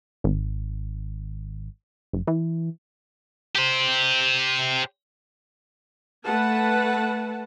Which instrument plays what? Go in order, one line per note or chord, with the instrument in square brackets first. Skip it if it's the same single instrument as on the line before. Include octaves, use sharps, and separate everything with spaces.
[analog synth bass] G#1
F#1
E3
[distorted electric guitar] G4 C5
[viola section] A3 B4 F#5 A5